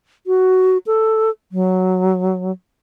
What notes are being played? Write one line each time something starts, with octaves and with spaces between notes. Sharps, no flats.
F#4
A4
F#3